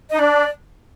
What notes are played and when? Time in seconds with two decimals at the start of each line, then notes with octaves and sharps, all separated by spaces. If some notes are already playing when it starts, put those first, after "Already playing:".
0.10 D#4 D#5
0.19 D4 D5